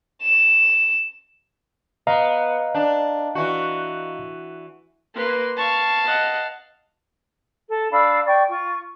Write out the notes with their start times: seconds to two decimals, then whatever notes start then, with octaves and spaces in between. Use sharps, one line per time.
0.22 E7
2.07 B3 D#5 F5 A#5
2.75 D4
3.35 E3 F#4
5.16 A#3 B4 C6
5.57 F5 A5 C#6
6.04 D#5 F#5
7.70 A4
7.91 D4 F5 B5 E6
8.25 D5 G5 C#6
8.49 F4 C#6